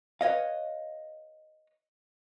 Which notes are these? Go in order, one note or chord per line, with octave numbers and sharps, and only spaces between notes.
B4 C#5 D#5 F5